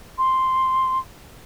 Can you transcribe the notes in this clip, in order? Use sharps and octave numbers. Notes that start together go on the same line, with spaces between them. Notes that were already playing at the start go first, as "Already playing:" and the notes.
C6